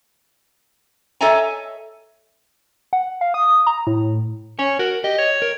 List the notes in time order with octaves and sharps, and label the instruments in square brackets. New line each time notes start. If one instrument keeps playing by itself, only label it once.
[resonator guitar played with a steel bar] A4 C#5 D#5 E5 G#5 A#5
[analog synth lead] F#5
F5
D#6
A#5
A2
[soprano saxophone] C#4 [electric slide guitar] C#5
[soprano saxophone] F#4 [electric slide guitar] A#4
[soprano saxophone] G4 [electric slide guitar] D#5
[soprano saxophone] C#5
[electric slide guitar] A#4